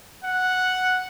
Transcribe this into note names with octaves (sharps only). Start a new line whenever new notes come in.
F#5